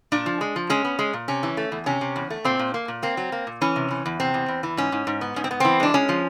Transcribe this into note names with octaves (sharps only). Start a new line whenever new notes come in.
A#2 D4
F3
G#3
F3
G#3 C#4
B3
G#3
A#2
C3 C#4
E3
A3
E2
C3 C#4
C3
E2
A3
A#2 C4
A#2
A#3
A#2
A#3 C4
F#3
A#3
A#2
E3 C#4
C3
E3
E2
C3 C4
E2
E2
E3
G#2 C#4
G#2
G#2
B3
G#2 C#4
C4
B3
E3 C4
G#3 D4
G#3 C#4
F3